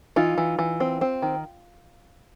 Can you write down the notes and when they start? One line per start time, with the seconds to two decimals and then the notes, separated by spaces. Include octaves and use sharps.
0.16 E3 D#4 F4
0.38 E3
0.59 E3
0.80 C4
1.01 C4
1.22 D#3